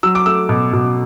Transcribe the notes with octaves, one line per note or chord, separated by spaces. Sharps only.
F#3 E6
D6
A3 E6
B2
B2